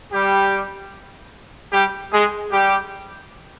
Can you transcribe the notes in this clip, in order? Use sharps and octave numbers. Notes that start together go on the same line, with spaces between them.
G3 G4
G3 G4
G#3 G#4
G3 G4